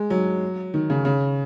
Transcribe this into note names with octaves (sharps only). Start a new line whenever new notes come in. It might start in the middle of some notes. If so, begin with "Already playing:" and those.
Already playing: G#3
F#3
D#3
C#3
C#3